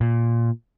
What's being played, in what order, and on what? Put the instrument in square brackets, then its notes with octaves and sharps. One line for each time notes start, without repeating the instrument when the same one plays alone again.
[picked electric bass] A#2